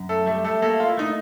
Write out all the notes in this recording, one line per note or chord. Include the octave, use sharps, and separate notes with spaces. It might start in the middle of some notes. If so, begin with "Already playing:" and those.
Already playing: F#2
A3 A4
G3 A3 A4
A3 A4
A3 A#3 A4
F4
E4
A3 D#4